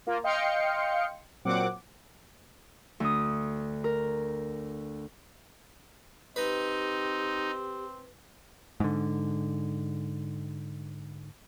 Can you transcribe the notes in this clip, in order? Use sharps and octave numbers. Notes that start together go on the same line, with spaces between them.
A#3 F4
D#5 F5 G5 C6 C#7
A#2 F#3 C4 F#5 D6
D2 D#6
A#4
C4 D#4 G4 B4
G#2 D3